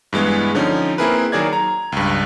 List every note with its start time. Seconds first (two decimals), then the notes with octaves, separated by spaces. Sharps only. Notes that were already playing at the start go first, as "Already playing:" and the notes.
0.13 G2 E3 G#3 B3
0.55 D3 F3 C#4 D#4
0.98 A#3 C4 E4 G#4 A#4 B4
1.32 D#3 F#3 G#4 A#4 D5 G#6
1.53 A#5
1.92 C#2 G2